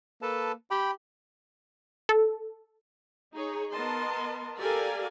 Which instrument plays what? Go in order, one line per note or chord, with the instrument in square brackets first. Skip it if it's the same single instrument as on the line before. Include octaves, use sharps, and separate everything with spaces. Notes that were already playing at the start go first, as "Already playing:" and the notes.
[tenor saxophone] A#3 [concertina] A4 B4 A5
[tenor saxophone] G4 [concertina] G5 B5
[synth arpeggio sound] A4
[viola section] D#4 G#4 C#5
B3 A#4 D#5 A5 C6
G4 A4 A#4 D5 F5 G#5